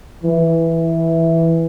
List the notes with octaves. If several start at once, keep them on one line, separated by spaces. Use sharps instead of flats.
E3